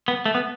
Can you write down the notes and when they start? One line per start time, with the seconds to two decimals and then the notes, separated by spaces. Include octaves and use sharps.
0.08 B3
0.26 A3
0.35 B3